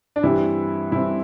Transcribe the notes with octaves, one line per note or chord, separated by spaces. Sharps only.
D4
G2 E3 G3 C4 E4
G2 E3 G3 C4 E4